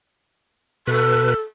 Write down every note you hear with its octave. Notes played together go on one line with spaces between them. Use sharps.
B2 A4 B4